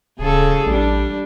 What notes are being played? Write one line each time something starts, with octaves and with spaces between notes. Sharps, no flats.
D1 C#3 G#4 A4
A1 G3 D4